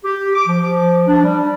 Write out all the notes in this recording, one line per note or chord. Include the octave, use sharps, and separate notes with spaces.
G4
D6
F3
D4
G3